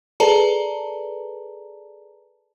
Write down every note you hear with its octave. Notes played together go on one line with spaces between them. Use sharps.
G#4 A4 B4 D5 A5 A#5